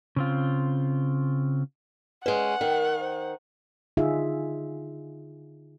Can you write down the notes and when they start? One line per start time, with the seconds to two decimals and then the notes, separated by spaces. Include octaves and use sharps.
0.16 C#3 C4 F4
2.26 G#3 C#4 B4 F#5
2.61 D#3 A#4
3.00 C5
3.97 D3 D#4 F4 G#4 E5 F5